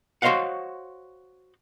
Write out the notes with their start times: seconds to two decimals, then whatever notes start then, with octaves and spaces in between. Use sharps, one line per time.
0.22 F#4 C5 C#5 D#5 F5 F#5